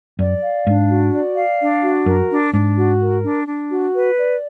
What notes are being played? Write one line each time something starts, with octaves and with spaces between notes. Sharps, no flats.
F#2 D5
F5
G#2 D4
F#4
D5
F5
D4
F#4
F#2 A#4
D4
G#2 D4
F#4
A#4
D4
D4
F#4
B4
D5